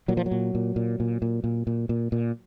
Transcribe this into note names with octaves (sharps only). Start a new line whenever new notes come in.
A#2 F#3
F3
F#3
A#2
A#2
A#2
A#2
A#2
A#2
A#2
A#2
A#2